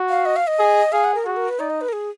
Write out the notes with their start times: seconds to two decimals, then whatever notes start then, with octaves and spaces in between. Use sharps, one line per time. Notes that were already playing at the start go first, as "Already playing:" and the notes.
Already playing: F#4
0.09 F5
0.25 D#5
0.36 F5
0.47 D#5
0.59 G#4
0.92 G#4 F5
1.04 F#5
1.15 A#4
1.25 F#4 G#4
1.36 A#4
1.48 B4
1.60 D#4 D5
1.70 D#5
1.81 B4
1.88 A#4
1.93 G#4